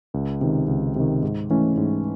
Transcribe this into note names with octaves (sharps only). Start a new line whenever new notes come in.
C#2
C3 D#3
C#2
C3 D#3
G#2
E3 A3 C#4
G#2